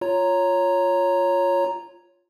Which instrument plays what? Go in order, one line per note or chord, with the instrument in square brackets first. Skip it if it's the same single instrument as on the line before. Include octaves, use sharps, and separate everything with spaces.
[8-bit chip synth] F4 C#5 A#5